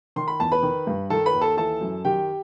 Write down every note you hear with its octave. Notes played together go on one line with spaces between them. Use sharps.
D#3 C6
B5
E2 A5
B4 B5
D#3
G2
D#3 A4 A5
B4 B5
D#2
A4 A5
E3 A4 A5
F#2
D#3 G4 G5